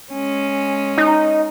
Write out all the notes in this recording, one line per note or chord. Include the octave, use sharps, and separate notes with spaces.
G#3 C#4
D#4